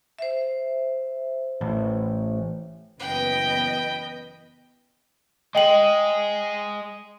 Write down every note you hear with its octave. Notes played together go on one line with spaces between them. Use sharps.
C5 E5
A1
F#1 E3 B3 B4 D#5 G5
G#3 G#4 D#5 G5 F#7